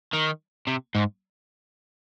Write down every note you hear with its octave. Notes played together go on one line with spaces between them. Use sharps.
D#3
C3
G#2